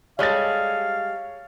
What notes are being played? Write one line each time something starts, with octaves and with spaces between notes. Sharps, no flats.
G3 G#3 A4 C#5 F5 A6